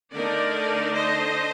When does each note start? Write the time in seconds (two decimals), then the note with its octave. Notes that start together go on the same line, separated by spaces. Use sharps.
0.12 D3 A3 D#4 A#4 D5
0.95 C5 D#5